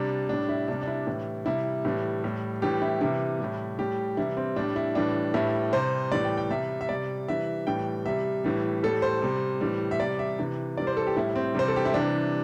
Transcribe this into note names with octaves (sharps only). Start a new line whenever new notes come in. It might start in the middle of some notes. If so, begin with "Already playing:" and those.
Already playing: C3 G3 D4
A2 G3 D4
E4
C3 G3 D4
D4
E4
A2 E3 G3
C3 G3 E4
A2 E3 G3
A2 G3
A2 E3 G3 G4
E4
C3 E3 G3 E4
A2 G3
A2 G3 G4
C3 E3 G3 E4
C4
A2 G3 D4
E4
A2 E3 G3 D4
A2 E3 G3 E4
C3 G3 C5
A2 E3 G3 D5
G5
G5
C3 G3 E5
E5
C3 G3 D5
C3 E3 G3 E5
A2 E3 G3 G5
C3 G3 E5
A2 E3 G3
A2 G3 A4
C5
C3 G3
A2 E3 G3
E5
C3 G3 D5
E5
C3 E3 G3
C3 E3 G3 D5
C5
A4
G4
A2 G3 E4
C4
C3 E3 G3 C5
A4
G4
E4
C3 E3 G3 D4